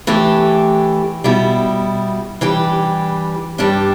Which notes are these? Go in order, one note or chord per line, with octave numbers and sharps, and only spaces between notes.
E3 A3 D4 G4
B2 G3 E4
E3 G3 D4 G4
G2 G3 D4 G4